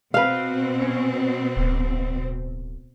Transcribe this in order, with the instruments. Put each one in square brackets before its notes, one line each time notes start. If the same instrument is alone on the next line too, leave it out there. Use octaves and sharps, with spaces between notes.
[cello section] B2 C4 [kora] B4 F5
[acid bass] C#4
D1